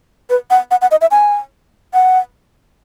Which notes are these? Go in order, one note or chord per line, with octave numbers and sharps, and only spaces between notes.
B4
F#5
F#5
F#5
D#5
E5
G#5
F#5